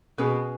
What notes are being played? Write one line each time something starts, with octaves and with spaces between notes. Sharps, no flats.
B2 C#4 G#4 B4